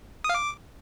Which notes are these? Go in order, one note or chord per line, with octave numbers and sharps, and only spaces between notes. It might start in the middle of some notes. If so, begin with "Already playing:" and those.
D#6
F5
D6